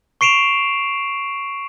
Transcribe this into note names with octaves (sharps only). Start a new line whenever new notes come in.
C#6 C7 D7 E7 F7